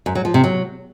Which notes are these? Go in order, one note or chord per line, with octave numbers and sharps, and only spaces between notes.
F#2
F#3
F3
C3
F#3